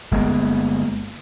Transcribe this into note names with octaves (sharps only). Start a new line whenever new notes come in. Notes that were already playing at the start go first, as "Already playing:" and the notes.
G1 G#3 A#3 B3